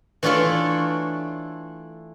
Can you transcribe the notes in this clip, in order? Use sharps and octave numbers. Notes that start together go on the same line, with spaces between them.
E3 A3 D4 F4 A4 C#5